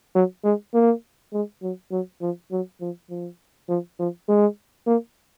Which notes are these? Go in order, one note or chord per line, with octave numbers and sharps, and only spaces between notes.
F#3
G#3
A#3
G#3
F#3
F#3
F3
F#3
F3
F3
F3
F3
G#3
A#3